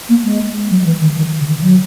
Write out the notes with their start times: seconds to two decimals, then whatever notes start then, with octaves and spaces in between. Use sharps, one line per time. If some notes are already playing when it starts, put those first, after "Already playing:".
0.09 A#3
0.24 G#3
0.70 F#3
0.81 F#3
0.85 E3
1.01 D#3
1.16 D#3
1.40 C#3
1.47 D#3
1.61 F#3